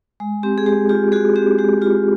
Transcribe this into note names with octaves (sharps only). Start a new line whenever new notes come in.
G#3
C4 G4
G#4
G#3 G4
F4 G4
G#3 F#4 G#4
C4 G4
G#3 G4
F4 G4